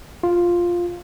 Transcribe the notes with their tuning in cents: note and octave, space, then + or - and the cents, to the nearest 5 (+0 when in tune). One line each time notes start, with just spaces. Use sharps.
F4 +5